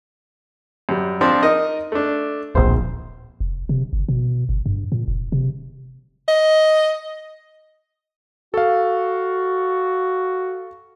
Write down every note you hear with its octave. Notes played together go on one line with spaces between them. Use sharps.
F#2 G3
F3 C4 D4
D#4 A#4 D#5
A3 D4
D1 A#1 C5
F1
C3
G1
B2
G1
G2
A#2
F1
C3
D#5
F#4 A4 F5